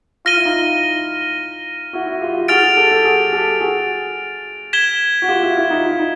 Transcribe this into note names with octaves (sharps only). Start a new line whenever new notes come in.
F4 F6 A#6 D#7 G7
E4
D#4 F4
E4 F#4
E4 F#4
F4 G4
F4 G4
F#4 G#4 F6 A6 D7 F7
F#4 G#4
G4 A4
G4 A4
F#4 G#4
G4 A4
F#4 G#4
G#6 B6 E7 G7
F#4
F4 G4
E4 F#4
E4 F#4
D#4 F4
F4
E4
D#4